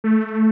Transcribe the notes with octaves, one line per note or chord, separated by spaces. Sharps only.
A3